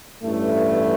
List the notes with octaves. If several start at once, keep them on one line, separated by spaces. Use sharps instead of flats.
A1 G2 E3 A3